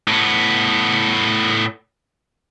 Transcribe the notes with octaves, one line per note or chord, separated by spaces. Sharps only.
A2 B3